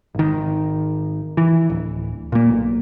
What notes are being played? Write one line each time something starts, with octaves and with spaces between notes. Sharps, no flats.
G#1 D#3
E3
D1
A#2 A#3
B1